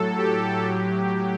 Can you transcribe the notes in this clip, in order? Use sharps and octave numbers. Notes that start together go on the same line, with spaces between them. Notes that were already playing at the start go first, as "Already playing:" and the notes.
Already playing: A2 F#3 A4
G4
A2 F#3